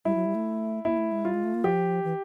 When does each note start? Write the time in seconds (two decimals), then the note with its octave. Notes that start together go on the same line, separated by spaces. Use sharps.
0.05 G3 E4
0.15 F#3
0.25 G3
0.35 A3
0.85 A#3 E4
0.98 A3
1.11 G#3
1.25 G3 F4
1.34 G#3
1.44 A3
1.54 A#3
1.64 F3 G4
2.04 E3